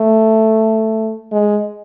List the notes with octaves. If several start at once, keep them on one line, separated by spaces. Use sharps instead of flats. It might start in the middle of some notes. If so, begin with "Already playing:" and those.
Already playing: A3
G#3